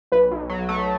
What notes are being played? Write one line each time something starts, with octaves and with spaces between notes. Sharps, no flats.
B1 B4
B1
F#3
A3